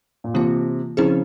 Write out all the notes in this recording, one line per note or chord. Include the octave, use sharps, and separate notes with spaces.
A#2
C3 E3 A#3 F4
C#3 F3 C4 E4 G#4 C5